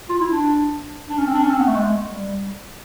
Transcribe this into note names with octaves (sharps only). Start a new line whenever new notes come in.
F4
E4
D4
D4
C#4
C4
D4
C#4
C4
B3
A3
G#3
G3